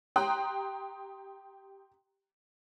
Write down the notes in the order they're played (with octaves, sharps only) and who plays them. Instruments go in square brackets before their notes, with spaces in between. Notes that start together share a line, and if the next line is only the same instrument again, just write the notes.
[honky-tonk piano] G4 G5 A#5 C6 D#6 F#6